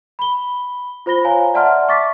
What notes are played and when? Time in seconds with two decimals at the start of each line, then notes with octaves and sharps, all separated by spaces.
0.19 B5 G7
1.06 F4 C5 B5 A#6 G7
1.25 C5 C#5 F5 G#5 A#5
1.54 D5 E5 F#5 A5 C6 F6
1.88 E5 C#6 D6 A6 B6